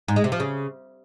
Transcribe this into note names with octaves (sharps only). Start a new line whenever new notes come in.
G#2
G#3
C3
F3
C#3